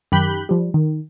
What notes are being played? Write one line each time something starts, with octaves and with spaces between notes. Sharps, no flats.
F#2 D#3 G4 B5 F#6 G6
F3 G3
D#3